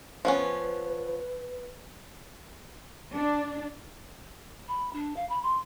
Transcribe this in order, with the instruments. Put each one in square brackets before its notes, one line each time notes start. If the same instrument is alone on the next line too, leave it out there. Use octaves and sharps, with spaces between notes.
[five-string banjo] F3 B3 C#4 [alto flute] B4
[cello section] D4
[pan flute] B5
D4
F5
B5
C6